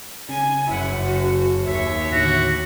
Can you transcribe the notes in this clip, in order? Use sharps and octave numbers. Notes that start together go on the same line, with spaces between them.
C#3 C#4 G#5
F#1 E4 F#5
F#4
D#2 C#5 E5
A2 D3 D#3 F#4